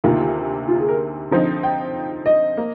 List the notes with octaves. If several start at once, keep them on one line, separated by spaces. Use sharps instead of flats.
D2 C3 D#3 A#3 F4
F4
G#4
A#4
D3 F3 C4 D#4
G5
D#5
A#3